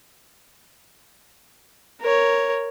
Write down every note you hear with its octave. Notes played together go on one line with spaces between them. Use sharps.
A#4 C#5